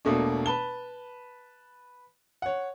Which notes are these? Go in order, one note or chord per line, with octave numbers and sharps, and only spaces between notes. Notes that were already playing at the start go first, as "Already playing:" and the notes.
E1 B2 A3 A#3 D4
B4 A5 G7
C#5 F#5